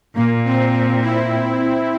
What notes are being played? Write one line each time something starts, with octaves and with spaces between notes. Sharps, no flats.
A#2 A#3
C4
C4
E4